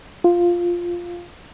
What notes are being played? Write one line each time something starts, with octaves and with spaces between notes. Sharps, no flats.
F4